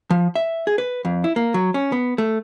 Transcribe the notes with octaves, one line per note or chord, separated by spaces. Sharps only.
F3
E5
G#4
B4
F2
E4
A#3
F#3
C#4
B3
A3